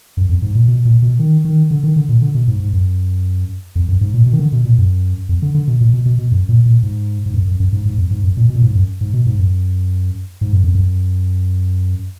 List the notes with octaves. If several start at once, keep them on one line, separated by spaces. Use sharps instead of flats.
F#2
F2
G#2
A#2
B2
A#2
B2
D#3
D#3
D3
D#3
D3
A#2
D3
B2
G#2
G#2
F#2
F2
F#2
G#2
A#2
B2
D#3
D3
B2
A#2
F#2
F2
D3
D3
B2
A#2
B2
B2
B2
F#2
A#2
A#2
G#2
G#2
F#2
F#2
F#2
G#2
G#2
F2
G#2
F#2
A#2
B2
A#2
G#2
F#2
G#2
B2
G#2
F#2
G#2
F#2
F2
F#2